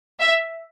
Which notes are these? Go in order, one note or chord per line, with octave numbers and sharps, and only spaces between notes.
E5